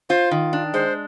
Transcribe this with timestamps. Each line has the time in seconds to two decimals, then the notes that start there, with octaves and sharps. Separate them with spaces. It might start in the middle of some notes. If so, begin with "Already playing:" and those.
0.09 F4 C5
0.31 D#3
0.53 D4
0.74 G#3 C5